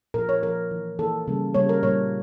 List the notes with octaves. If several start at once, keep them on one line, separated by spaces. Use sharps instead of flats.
A#2 F3 A#3 A#4
C#5
A#2 F3 A#3 A#4
E3 A#3
E3 A#3 A4
C#3 G3 A#3
C#3 G3 A#3 C#5
A#4
A#2 G3 A#3 C#5